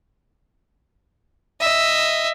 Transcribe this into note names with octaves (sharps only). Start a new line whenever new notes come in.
D#5 E5